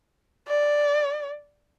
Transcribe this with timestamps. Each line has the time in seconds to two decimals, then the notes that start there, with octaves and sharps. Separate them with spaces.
0.48 D5